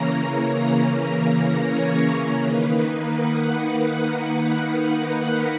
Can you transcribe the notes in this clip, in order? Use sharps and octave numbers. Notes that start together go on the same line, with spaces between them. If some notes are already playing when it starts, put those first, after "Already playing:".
Already playing: C#3 E3 A#3 C#4 A#5
A#5
C#5
D#3 A#3 D#4 B4
F#5
B5